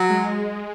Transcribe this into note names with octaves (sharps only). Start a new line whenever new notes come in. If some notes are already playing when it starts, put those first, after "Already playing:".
Already playing: F#3
G#3